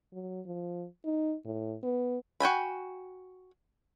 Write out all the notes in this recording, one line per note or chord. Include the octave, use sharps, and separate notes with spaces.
F#3
F3
D#4
A2
B3
F#4 G5 G#5 B5